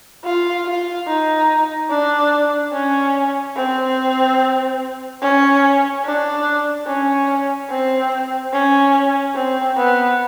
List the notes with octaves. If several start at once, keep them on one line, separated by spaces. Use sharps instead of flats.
F4
F4
D#4
D4
C#4
C4
C#4
D4
C#4
C4
C#4
C4
B3